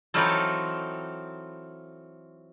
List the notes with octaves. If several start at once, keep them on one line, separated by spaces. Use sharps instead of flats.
E3 F#3 C4 D#4 F4 A4